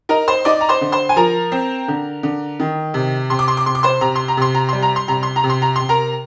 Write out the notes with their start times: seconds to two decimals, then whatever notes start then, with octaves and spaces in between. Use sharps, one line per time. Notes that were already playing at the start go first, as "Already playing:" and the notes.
0.09 D#4 A#4 A#5
0.28 C5 C6
0.45 D#4 D5 D6
0.61 A#5
0.69 C5 C6
0.81 D3
0.92 C5 C6
1.09 G#5
1.16 F3 A#4 A#5
1.52 C4
1.88 D3
2.23 D3
2.60 D#3
2.94 C3
3.30 C3 C6
3.39 D6
3.48 C6
3.57 D6
3.66 C3 C6
3.75 D6
3.83 C5 C6
4.01 C3 A#5
4.15 C6
4.28 A#5
4.37 C3 C6
4.55 A#5
4.69 G3 C6
4.82 A#5
4.96 C6
5.08 C3 A#5
5.23 C6
5.36 A#5
5.44 C3
5.50 C6
5.62 A#5
5.76 C3 C6
5.89 A#4 A#5